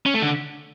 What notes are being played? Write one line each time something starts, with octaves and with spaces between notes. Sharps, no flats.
C#4
A3
D3